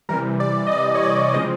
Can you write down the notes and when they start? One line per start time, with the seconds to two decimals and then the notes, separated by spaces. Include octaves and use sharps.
0.09 C3 E3 G3 A#4
0.40 D5
0.67 D#5
0.71 D5
0.95 C#5
1.03 D5
1.34 C#3 F3 G#3 C4 D#5